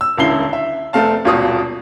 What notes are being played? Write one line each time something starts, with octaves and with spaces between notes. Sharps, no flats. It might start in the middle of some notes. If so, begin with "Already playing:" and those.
E6
D#1 C#2 D3 E4 C7 G7
E5
F1 A3 C4 F5 A5
D#1 G#1 B2 F4 F#4 D#6